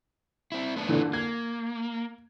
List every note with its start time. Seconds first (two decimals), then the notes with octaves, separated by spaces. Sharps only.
0.52 C4 E4
0.76 A3 B3 D4
0.89 A#2 D3 E3
1.13 A#3 G#6